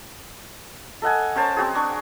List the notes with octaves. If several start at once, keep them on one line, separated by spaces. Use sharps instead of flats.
A4 D#5 F#5 G#5
C#4 A#4 C5 A5
C4 F#4 G#4
D4 C#6